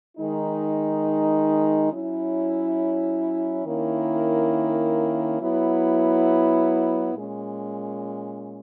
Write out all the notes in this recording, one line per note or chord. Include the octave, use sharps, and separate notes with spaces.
D#3 G#3 D#4
F#3 C#4 E4
D#3 A#3 C#4 E4
F#3 B3 E4
A#2 G#3 C#4